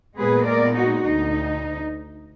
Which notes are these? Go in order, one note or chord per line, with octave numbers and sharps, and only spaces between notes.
A#2 G#3 B3 G#4 B4
A#4 D5
D#4 F#4
D2 D#4